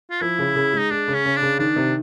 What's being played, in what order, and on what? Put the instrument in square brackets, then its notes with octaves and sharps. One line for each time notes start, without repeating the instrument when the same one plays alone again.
[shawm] F4
[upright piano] F3 [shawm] E4
[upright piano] C#3
C#3
G#3
[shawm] D#4
[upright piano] G#3 [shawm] D4
[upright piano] C#3
[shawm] C#4
[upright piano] C#3
[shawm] D4
[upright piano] C#3
[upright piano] D#3 [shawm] D4
[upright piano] C3